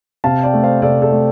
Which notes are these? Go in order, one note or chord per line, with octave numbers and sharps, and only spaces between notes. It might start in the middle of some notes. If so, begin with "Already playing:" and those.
C3 F5 A5
D5 G5
A3
C5 F5
C3 A4 D5
A4 D5
A3